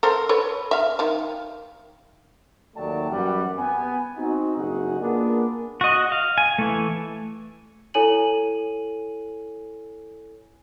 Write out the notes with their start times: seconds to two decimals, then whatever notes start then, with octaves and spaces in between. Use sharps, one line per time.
0.03 A4 A#4 C5
0.29 A4 B4 C#5
0.71 E5 F5
0.99 D#3 F5
2.76 D#2 F#3 A3 D5 G5 A5
3.10 F#2 E3 G3 F#4 F#5
3.58 B3 G#5
4.18 C4 D#4 F#4
4.57 F#1 G2 D#4 F#4 G#4 F#5
5.00 A#3 B3 D4 F4 G#4 A#4
5.81 F#4 D#5
6.12 F5
6.38 G#5
6.58 E3 A3
7.94 E4 A4 C#5 G#5 D#7 F#7